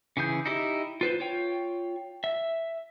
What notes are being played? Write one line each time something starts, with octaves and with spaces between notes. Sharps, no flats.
C#3 E3 G#4 G6
D#4 E4 G4 D#5
F4 B4 C5
F4 C#5 G5
E5